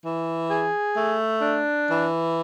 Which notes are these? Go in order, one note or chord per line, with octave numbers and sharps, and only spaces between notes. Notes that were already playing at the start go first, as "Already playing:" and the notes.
E3
G#4
A3
D4
E3